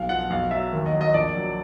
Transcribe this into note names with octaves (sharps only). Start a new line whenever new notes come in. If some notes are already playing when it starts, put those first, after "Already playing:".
Already playing: B1 F5
F3 F#5
B1 F5
F#3 E5
D#2
D#5
F#3
D#5
A#1 D5
F#3